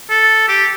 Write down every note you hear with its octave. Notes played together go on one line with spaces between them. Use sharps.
A4
G4